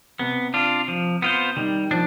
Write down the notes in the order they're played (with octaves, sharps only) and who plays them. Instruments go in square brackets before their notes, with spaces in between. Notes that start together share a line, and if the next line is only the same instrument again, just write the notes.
[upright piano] C3 [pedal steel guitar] B3
[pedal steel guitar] D4 F4
F3
B3 F4 C5
[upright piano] D#3 [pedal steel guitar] G3
[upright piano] F3 [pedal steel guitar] D4